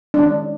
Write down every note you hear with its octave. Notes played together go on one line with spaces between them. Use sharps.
D#3 G#3 C#4 D4